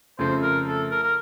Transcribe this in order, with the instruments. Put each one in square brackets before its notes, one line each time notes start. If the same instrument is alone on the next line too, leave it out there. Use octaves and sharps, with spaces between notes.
[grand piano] F2 C#3 F3 A3 C4 [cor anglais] C5
[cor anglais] A#4
A4
A#4
A#4